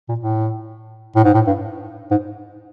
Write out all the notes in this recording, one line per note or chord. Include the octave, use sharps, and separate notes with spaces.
A#2
A2
A2
G#2
A2
G2
G#2